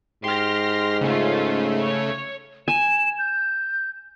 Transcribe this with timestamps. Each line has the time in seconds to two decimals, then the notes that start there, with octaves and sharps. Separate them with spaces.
0.24 G#2 G4 C6 F6 A#6
1.01 C#3 A3 C#4 F4
1.81 C#5
2.68 G#5 E7
3.19 G6